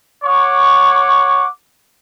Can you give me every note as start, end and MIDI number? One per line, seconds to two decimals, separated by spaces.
0.24 1.45 73
0.24 1.45 78
0.24 1.45 85
0.24 1.45 86